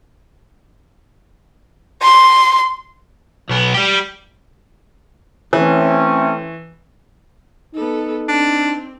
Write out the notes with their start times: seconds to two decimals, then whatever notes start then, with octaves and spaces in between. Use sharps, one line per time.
2.02 C6
3.49 B1 B3
3.74 G3 G4
5.53 E3 A3 C4 C#4
7.75 B3 D#4 A4
8.28 C4 D4